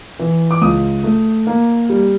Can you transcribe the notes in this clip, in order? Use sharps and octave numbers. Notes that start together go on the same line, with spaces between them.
E3
D6
C#2 D#6
A3
A#3
G3